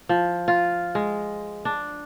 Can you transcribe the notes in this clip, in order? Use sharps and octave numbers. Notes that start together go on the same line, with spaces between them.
F3
F4
G#3
D4